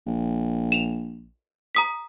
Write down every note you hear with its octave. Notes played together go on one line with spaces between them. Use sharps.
A#1
E7 F7
A#5 D#6 B6